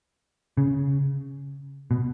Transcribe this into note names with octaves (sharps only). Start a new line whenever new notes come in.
C#3
B2